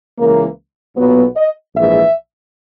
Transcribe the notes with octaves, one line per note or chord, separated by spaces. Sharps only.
C#2 C#3 E3 A#3
B1 A#2 F#3 B3
D#5
A#1 G#2 E3 E5